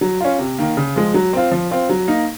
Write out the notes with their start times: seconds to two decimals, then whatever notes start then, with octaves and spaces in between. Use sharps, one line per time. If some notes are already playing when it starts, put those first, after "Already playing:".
0.01 F#3
0.21 C#4 F4
0.39 C3
0.58 D#3 A#3
0.77 C#3
0.96 F3 G#3
1.14 F#3
1.33 C4 F4
1.52 F3
1.71 C4 F4
1.89 F#3
2.08 A#3 D#4